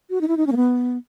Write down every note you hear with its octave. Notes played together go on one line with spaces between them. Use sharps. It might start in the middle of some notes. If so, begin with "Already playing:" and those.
F#4
D#4
E4
D#4
C#4
A#3
B3